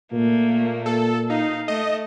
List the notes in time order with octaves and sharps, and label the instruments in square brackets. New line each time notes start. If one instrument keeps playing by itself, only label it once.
[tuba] A#2 [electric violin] A3 A#3
[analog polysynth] A4
[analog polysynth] D#4 [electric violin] F5
[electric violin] A3 [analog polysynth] D#5